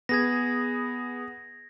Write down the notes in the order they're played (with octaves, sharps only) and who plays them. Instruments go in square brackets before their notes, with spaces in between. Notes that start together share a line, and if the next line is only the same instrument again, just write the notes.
[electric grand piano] B3 G#4 [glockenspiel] G#6 A#6